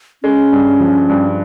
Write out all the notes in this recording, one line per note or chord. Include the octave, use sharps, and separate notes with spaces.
G#3 C#4
G2
F3
G2